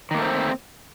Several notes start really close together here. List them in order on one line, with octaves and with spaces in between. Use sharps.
D#3 A#3 A3 C4